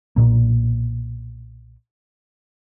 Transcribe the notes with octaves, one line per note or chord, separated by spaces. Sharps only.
B1 E2 A#2 A#3